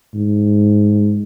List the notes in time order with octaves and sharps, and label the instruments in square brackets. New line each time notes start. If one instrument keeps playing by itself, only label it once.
[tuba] G#2